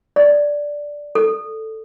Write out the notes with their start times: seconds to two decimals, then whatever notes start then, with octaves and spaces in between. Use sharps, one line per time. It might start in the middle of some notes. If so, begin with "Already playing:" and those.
0.16 D5
1.15 A4